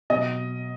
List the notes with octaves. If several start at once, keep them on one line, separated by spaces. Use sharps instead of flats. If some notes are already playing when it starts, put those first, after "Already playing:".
B2 F#3 D#5